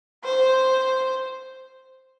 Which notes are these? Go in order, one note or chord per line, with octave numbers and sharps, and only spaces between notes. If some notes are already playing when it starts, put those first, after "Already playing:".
C5